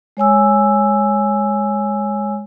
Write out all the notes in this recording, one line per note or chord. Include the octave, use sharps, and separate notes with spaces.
G#3 C#5 G#5 E6